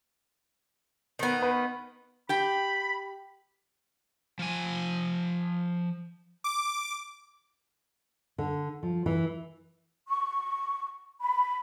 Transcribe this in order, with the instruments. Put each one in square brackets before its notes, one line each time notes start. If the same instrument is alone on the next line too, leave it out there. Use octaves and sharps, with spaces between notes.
[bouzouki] D#3 B3
[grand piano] B4
[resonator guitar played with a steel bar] G4 G5 [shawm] B5
[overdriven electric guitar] F3 G#5
[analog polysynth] D6
[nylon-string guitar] D3
F3
E3
[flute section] C#6
B5